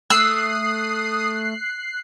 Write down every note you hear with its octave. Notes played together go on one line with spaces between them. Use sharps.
A3 D#6 E6 F#6 C7